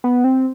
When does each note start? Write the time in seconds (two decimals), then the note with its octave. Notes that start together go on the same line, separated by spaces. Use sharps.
0.04 B3
0.24 C4